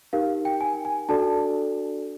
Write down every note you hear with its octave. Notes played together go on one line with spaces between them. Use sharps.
D#4 G4 A#4 F5
G5
G#5
G#5
D4 F#4 A4 D5 A5